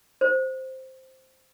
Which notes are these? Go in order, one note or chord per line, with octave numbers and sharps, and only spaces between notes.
C5